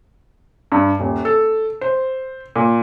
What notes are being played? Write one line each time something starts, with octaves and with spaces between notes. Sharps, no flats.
G2
D#1
A4
C5
A#2